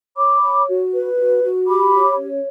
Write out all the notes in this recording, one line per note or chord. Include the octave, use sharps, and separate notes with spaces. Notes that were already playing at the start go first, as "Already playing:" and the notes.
C#5 B5 D6
C#5
F#4
B4
F#4
F#4
G4 B5 D6
C#5
C#4